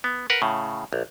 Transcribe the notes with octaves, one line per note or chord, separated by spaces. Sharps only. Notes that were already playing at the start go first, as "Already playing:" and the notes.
B3
A#4 B4 F#5
A2 C#3
A#1